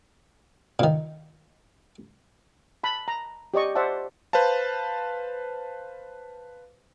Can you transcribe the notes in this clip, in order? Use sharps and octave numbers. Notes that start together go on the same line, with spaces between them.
A#2 D#3
A5 B5
A#5
G4 D5 D#5 C#6
C5 D5 E5 F#5 A5
B4 C5 F5 A5